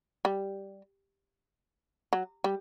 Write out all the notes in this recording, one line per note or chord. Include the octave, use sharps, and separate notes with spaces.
G3
F#3
G3